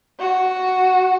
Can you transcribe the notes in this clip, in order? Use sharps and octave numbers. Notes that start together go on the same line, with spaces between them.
F#4